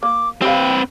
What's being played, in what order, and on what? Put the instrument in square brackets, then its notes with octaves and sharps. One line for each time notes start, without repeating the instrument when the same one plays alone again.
[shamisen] A#3 [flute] D6
[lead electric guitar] C4 B4 [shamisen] G4 F5 [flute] G5